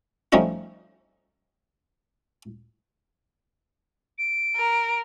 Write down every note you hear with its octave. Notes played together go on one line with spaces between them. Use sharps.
F3 G3 A3 C#4 D#4 F4
D7
A#4